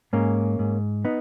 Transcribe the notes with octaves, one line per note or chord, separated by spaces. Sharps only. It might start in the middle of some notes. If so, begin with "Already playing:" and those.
G#2 A#3 C#4
G#2
B3 D#4